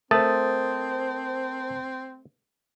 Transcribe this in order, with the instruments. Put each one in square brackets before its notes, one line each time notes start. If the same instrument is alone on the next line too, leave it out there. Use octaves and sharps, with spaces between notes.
[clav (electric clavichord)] A3 [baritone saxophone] C4 [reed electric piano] A#4 D#6 A6 [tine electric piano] C5 A5